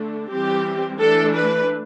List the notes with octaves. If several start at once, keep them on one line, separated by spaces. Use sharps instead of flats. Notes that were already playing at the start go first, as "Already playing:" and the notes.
Already playing: D3 A3 D4
E3 G3 C4 G4
E3 A3 D4 A4
B4